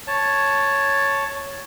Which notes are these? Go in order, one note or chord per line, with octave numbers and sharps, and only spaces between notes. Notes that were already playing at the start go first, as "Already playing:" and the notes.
C#5 A5